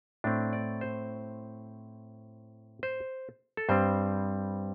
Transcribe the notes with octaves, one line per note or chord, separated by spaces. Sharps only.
A2 A3 C4 D4
D5
C5
C5
A4
G2 G3 C4 C5